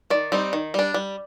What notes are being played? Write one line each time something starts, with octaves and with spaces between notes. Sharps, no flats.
D#3 D5
G3 C4 D#4
D#3
G3 D4
G3